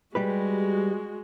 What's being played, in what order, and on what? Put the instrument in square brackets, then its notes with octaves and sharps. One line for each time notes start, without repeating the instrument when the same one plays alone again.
[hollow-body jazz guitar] G3 G4 B4 [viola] G#3 F#4